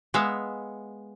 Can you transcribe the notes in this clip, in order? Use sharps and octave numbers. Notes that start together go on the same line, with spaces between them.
G#3 B3 E5 F5